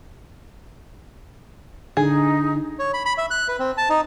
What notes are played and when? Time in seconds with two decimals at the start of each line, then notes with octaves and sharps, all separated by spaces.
1.97 D3 D#4 G#4
2.79 C#5
2.94 B5
3.06 B5
3.18 E5
3.31 F#6
3.48 B4
3.59 C4
3.78 A5
3.90 D#4